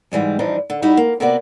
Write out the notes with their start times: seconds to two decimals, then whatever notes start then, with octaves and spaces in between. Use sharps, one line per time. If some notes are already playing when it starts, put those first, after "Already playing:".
0.12 G#2 E3 G3 G#3
0.39 G2 E3 F3 D4 D#4
0.70 D3
0.82 G3 D#4 E4 F#4
0.97 A#3
1.20 C3 A#3 B3 F#4 D5